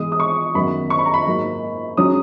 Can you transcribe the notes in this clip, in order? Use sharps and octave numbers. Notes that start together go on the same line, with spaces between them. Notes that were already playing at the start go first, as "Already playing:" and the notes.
Already playing: G#2 E3 G#3 B3 D#6
D#6
C#6
F#2 D#3 F#3 B3 B5
C#6
B5
A#5
B5
G#2 F#3 A#3 D#4
C#3 F#3 C#4 D#6